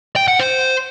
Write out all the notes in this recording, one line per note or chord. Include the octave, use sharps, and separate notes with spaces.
G5
F#5
C5